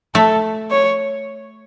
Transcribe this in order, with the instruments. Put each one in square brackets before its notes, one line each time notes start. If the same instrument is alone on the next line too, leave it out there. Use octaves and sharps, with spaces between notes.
[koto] A3 [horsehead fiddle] A4
[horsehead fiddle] C#5